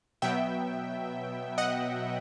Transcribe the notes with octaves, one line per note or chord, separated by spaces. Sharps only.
B2 F#3 B3 E5 G5
D#5 F#5